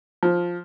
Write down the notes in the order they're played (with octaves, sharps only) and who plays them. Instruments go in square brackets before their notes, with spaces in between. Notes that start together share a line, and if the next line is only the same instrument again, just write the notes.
[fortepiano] F3